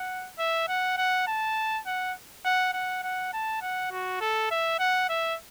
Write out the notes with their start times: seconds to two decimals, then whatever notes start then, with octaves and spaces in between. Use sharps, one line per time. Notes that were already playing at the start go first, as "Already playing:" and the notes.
Already playing: F#5
0.39 E5
0.69 F#5
0.98 F#5
1.27 A5
1.87 F#5
2.45 F#5
2.74 F#5
3.03 F#5
3.33 A5
3.62 F#5
3.92 F#4
4.21 A4
4.51 E5
4.79 F#5
5.09 E5